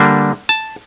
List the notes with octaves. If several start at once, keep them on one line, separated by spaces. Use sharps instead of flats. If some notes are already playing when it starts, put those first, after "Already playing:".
Already playing: D3 G3 A#3 D4
A5